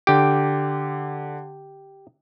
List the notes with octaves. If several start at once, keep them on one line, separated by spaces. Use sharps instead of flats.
D3 G4 D7